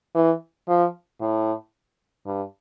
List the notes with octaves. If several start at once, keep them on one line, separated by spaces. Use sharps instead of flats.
E3
F3
A2
G2